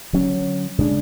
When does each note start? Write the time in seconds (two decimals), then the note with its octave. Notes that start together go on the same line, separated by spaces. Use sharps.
0.13 D3 F#3 C#4
0.78 C#3 G#3 D4